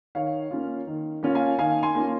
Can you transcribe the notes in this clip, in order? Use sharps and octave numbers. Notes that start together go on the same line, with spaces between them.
D#3 C#5 F5
A#3 C#4 F4
D#3
A#3 C#4 F4
F5 G#5
D#3 F5 G#5
G#5 C6
A#3 C#4 F4